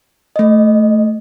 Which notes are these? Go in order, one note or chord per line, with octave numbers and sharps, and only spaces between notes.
A3 D#5